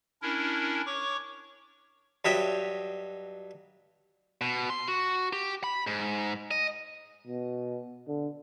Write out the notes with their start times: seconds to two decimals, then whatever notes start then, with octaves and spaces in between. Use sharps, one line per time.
0.22 C#4 D4 E4 A#4
0.86 C#5 C#6 D6
2.25 G2 F#3 D#5 E5 G5
4.41 B2
4.70 C6
4.88 F#4
5.33 G4
5.64 B5
5.87 G#2
6.51 D#5
7.27 B2
8.07 D3